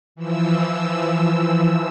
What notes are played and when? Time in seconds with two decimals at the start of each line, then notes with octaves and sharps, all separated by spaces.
0.16 E3 F3 E6